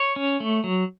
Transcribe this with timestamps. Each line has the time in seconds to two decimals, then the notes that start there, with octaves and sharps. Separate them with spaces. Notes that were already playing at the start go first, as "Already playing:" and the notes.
Already playing: C#5
0.16 C#4
0.40 A3
0.64 F#3